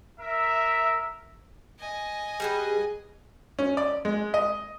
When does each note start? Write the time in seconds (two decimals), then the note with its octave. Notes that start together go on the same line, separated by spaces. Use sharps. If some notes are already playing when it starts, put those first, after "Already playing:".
0.20 A#4 E5
1.80 D#5 G#5
2.40 G3 G#4 B4
3.59 C#4
3.77 D5
4.05 G#3
4.34 D#5